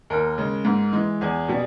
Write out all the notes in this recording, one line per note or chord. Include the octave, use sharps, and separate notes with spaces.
D#2 A#4
C#3 G#3
G#2
E3 G#3
E2 G#4
B2 G3